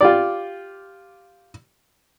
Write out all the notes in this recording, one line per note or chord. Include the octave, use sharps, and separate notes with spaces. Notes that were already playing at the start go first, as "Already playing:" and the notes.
F4 G4 D5